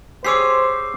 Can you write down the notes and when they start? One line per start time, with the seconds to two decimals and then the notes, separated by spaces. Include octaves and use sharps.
0.25 G4 G#4 C5 C#5 D6 E6 C7